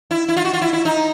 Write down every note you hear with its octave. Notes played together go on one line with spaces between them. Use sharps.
E4
E4
F4
F#4
F4
E4
E4
D#4